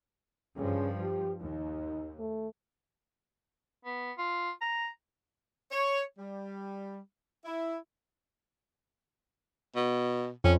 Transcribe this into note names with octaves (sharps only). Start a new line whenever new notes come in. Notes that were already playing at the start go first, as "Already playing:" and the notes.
G2 C#3 F3
G4
D#2 D#4
A3
B3
F4
A#5
C#5
G3
E4
B2
F2 C#4